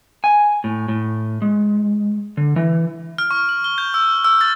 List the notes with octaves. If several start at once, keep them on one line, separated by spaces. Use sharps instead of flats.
G#5
A2
A2
G#3
D3
E3
F6
C#6
F#7
G7
G6
E6
E6
A6